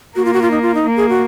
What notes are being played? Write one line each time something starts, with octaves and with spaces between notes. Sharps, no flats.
A#3 F#4
F4
F#4
F4
D#4
F4
D#4
A#3
G#4
F#4